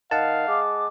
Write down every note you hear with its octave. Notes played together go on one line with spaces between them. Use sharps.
D#3 F5 F#5 A5
G#3 D6